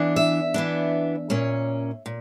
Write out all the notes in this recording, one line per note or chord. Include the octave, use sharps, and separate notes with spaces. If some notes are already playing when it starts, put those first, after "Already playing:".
Already playing: E3 B3 D4
E5
E3 B3 D4
A#2 A#3 C#4
A#2